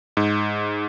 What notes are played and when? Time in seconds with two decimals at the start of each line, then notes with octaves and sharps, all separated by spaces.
0.17 G#2